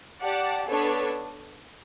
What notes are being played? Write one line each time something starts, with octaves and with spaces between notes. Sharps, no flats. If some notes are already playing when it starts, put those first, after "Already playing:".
G4 D5 F#5 A5
B3 D4 A4 C#5